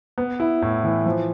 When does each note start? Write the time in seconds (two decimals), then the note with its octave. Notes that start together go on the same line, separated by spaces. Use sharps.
0.18 B3
0.40 E4
0.62 A2
0.84 E3
1.06 F3